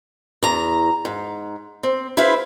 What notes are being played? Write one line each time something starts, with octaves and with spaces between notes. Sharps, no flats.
E2 A#5
G#2
C4
E4 G#4 B4 C5 E5 F5